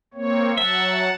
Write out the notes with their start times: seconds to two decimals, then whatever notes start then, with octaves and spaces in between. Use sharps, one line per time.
0.14 A#3 C4 C#5
0.57 F#3 E5 F#5 A5